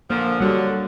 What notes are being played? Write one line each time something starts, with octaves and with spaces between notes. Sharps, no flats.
A#2 D3 F3 A#3
D3 F#3 G3 F#4 A4